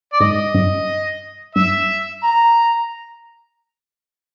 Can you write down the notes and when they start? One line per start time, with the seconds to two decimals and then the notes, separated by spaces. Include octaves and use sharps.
0.13 D5
0.20 G#2 D#5
0.54 G2
1.55 G2 E5
2.23 A#5